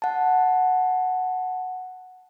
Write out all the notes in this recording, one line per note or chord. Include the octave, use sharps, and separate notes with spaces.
F#5 A5